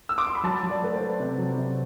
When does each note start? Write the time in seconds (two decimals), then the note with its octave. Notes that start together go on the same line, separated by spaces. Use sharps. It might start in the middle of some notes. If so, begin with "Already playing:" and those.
0.09 E6
0.18 D6
0.27 C6
0.35 B5
0.44 F#3 A5
0.63 F#3
0.70 D5
0.82 A3 B4
0.95 C5
1.01 A3
1.20 C3
1.38 F#3
1.57 C3